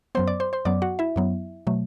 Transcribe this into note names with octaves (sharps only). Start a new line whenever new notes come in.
F#2 F#3 B3 C5 C6
D5 D6
C5 C6
C5 C6
F#2 F#3 B3 D5 D6
F#4 F#5
E4 E5
F#2 F#3 B3
B2 F#3 A3